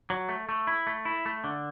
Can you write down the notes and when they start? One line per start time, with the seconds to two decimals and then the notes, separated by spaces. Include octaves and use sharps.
0.10 F#3
0.29 A3
0.49 A3
0.67 E4
0.87 A3
1.05 E4
1.26 A3
1.44 D3